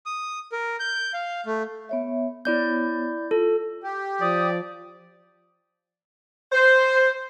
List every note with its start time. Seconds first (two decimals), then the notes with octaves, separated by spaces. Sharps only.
0.06 D#6
0.52 A#4
0.80 G6
1.14 F5
1.46 A3
1.89 B3 C#5 E5
2.45 B3 E4 C#5 D5 G6
3.31 F4 A4
3.83 G4
4.21 F3 D5 D#6
6.52 C5